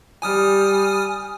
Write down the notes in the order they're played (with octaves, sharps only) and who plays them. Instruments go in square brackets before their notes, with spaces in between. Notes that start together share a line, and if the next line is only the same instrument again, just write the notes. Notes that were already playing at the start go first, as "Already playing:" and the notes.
[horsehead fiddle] G3 [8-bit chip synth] G#5 D#6 F6